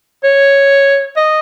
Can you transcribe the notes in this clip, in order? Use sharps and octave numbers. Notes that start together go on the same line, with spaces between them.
C#5
D#5